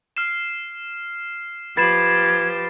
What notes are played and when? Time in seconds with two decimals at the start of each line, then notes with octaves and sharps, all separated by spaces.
0.17 F6 C7 E7
1.77 F3 G4 B4 G#6 A6 C7 E7